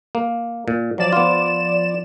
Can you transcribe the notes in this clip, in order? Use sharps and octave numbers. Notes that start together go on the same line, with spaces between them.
A#3
A#2
F3 F#3 D5 E7
B3 F4